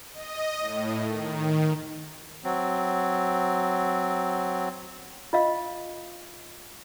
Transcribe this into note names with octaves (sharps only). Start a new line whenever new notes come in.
D#5
A2
D#3
F#3 C4
F4 D#5 F5